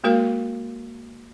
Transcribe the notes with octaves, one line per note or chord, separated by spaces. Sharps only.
G#3 A#3 F#4 A#4 F5